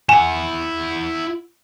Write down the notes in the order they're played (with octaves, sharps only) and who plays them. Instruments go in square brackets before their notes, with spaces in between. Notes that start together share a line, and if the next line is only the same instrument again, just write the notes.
[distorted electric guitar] E4 F#5 [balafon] G#5